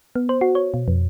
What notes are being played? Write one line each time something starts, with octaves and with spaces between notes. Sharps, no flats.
B3
C5
F#4
C#5
B2
F2